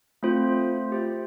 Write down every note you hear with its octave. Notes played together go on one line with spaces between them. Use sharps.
A3 C4 F4 C5
G4 C5 E5